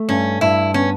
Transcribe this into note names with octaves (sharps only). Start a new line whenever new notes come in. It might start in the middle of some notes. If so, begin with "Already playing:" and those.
Already playing: A3
G2 C#4
G2 E4
B3 C#4